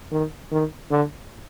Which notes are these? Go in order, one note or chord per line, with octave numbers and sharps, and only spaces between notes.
D#3
D#3
D3